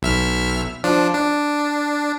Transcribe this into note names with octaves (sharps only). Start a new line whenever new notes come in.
B1 E5 F6
F3 D4
D4